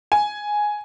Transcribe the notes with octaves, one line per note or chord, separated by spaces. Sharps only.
G#5